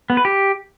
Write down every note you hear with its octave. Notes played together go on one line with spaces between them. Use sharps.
B3
B4
G4